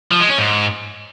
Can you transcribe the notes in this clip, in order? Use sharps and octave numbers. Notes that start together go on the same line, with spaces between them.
F3
G#3
C#4
G#2